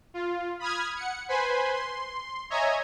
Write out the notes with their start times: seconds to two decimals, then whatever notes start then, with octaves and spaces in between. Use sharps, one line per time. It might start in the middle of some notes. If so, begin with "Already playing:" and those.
0.14 F4
0.59 B5 D#6 F6 G#6
0.96 F#5 C#7
1.28 B4 C5 G#5 B5 C6
1.74 C6
2.50 C#5 D#5 E5 G#5 A#5 G#6